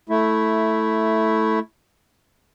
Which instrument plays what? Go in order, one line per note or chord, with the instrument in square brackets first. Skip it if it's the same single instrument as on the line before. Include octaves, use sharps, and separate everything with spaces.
[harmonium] A3 E4